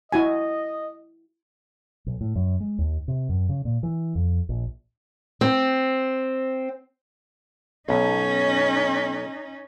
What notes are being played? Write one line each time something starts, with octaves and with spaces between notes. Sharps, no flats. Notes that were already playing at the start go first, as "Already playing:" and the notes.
E4 F#4 D#5 G#5
B1
A2
F#2
G#3
D#2
C3
F#2
C#3
A#2
E3
F2
A#1
C4
B1 C#4 D#4